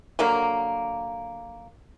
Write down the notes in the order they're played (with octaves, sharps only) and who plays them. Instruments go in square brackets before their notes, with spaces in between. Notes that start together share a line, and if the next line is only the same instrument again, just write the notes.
[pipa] D3 F#3 A#3